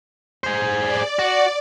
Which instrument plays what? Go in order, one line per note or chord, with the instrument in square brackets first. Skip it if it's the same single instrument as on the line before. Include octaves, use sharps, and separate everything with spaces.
[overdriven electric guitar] G#4 C5
[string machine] D5
[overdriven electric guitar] F#4